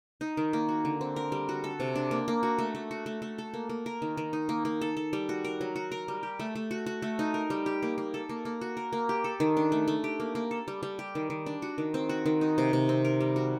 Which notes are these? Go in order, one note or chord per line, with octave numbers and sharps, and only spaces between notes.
D#4
D#3
A#3
F#4
D3
C4
A#4
G3
F#4
A4
C3
D4
A#3
A#3
F#4
A3
A3
F#4
A3
A3
A4
A#3
A#3
A#4
D#3
D#3
D#4
A#3
A#3
A4
A4
G3
F#4
A#4
F#3
F#4
A#4
G3
G4
A3
A3
F#4
F#4
A3
D#4
A#4
G3
G4
A#3
A#3
A4
A#3
A#3
F#4
A#4
A#3
G4
A4
D#3
D4
A3
A3
G4
A#3
A#3
A4
G3
G3
G4
D#3
D#3
D4
F#4
D#3
C4
F#4
D#3
D#4
C3
C3
C4
A#4
G3
F#4